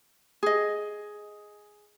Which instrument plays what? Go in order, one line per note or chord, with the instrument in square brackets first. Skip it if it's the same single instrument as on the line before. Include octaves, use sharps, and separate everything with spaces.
[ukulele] G#4 D#5